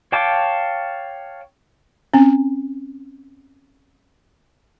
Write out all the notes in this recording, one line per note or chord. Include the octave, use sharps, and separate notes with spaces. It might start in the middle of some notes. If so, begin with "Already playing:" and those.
C#5 F5 G5 A5 D6
C4 C#4